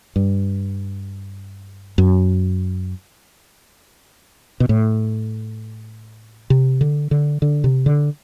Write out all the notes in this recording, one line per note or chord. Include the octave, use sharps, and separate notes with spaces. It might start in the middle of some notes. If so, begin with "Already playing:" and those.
G2
F#2
B2
A2
C3
D3
D3
D3
C3
D3